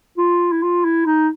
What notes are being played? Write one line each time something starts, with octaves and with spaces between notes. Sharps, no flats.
F4
E4
F4
E4
D#4